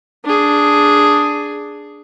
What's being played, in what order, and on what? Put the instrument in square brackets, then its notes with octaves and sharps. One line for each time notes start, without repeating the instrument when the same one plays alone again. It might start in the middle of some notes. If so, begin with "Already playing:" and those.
[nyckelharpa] D4 G#4